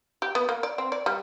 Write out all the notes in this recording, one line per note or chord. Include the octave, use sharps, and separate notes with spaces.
G4
B3
A#3
D5
C4
D5
G3